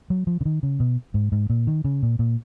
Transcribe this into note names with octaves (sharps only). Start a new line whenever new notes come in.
F#3
F3
C#3
D#3
C#3
B2
G#2
G#2
A#2
D#3
C#3
A#2
A#2